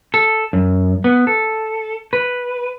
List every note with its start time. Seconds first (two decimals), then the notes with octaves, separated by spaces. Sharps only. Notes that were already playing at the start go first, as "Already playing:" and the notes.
0.14 A4
0.53 F#2
1.04 B3
1.27 A4
2.13 B4